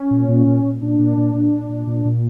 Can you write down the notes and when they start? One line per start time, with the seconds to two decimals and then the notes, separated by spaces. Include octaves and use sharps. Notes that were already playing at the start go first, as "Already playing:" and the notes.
Already playing: C#4
0.11 A#2
0.28 A#2
0.46 A#2
0.63 A#2
0.82 A#2 D4
0.99 A#2
1.17 A#2
1.34 A#2
1.52 A#2
1.69 A#2
1.87 A#2
2.05 A#2